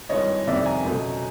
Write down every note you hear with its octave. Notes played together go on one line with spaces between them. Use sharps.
G#1 G2 E3 G#3 C#5 D#5
G1 F2 C3 D#3 D5 E5
G#5 A#5
C#2 B2 F#3 A3